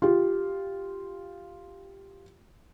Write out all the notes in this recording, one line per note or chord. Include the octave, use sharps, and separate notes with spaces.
F4 G4